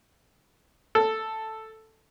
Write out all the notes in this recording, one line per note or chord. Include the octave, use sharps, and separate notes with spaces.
A4